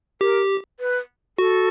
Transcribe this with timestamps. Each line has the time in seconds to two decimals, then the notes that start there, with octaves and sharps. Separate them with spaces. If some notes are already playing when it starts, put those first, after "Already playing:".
0.21 G4 A#4
0.80 B4
1.38 F#4 A4